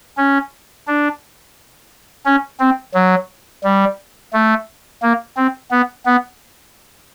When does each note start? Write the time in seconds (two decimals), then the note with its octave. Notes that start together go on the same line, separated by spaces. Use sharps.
0.17 C#4
0.87 D4
2.26 C#4
2.60 C4
2.94 F#3
3.63 G3
4.33 A3
5.02 A#3
5.37 C4
5.71 B3
6.06 B3